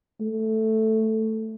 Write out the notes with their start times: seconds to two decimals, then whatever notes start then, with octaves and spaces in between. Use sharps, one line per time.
0.21 A3